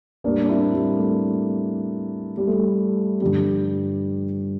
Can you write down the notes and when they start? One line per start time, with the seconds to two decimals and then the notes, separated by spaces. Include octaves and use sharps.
0.24 A2 G3 A#3 D4
0.44 D4
0.49 C4 E4
0.74 G3
0.98 A3
2.37 G3
2.47 A3
3.21 G2 D3 F3 G3